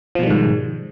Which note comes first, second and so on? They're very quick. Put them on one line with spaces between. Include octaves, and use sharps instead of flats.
F3 B2 G3 D#3 G#2